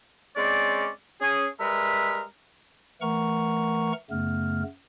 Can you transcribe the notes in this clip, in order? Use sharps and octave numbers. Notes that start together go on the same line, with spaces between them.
G#3 C4 C#4 D5
C#4 G#4
G3 G#3 A#4 B4 E5
E3 A3 A#4 F#5 A#5 C#6
F#2 C#3 A3 B3 F6